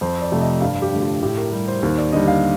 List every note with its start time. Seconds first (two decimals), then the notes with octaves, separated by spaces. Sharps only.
0.01 F2 C5
0.21 D5
0.32 C3 F3 A3
0.41 D#5
0.61 G2 F5
0.82 G4
0.92 D3 A3
1.02 F4
1.22 A2 G4
1.37 A#4
1.52 G3
1.68 C5
1.83 D#2 C5
1.98 D5
2.12 D3 G3 D#5
2.27 F5